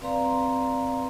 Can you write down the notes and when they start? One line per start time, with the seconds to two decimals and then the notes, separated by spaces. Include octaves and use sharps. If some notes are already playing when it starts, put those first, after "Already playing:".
0.01 C4 B4 D5 F5 A#5 C6